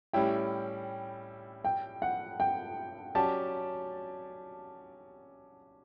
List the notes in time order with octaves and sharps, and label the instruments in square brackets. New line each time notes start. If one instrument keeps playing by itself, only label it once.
[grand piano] A2 G3 C#4 E4 [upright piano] G5
[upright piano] G5
F#5
G5
[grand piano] F#3 C#4 G4 D5 [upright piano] A5